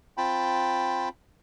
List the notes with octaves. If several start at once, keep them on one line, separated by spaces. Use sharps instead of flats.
C4 F4 G5 A5 B5